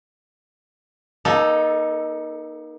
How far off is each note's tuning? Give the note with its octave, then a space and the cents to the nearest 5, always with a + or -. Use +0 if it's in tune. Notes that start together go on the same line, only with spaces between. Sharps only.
A#3 +35 D#4 +0 A4 +0